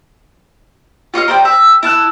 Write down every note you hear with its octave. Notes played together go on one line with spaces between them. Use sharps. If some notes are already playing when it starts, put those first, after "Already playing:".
F4 C#5 D#5 F5
A#4 C5 D5 G5
E5
E4 A5 F6 F#6